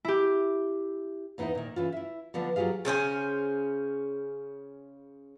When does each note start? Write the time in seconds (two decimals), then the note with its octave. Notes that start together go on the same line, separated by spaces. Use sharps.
0.05 E4 G4
1.38 E2 B3 D#4 E4 C5 D#5
1.55 A#2 D#3
1.76 C#3 E3 F4
1.92 E4 E5
2.34 D3 F3 B3 D4
2.56 F#3 F4 G4 G#4 F5
2.85 C#3 C#4 C5 G#5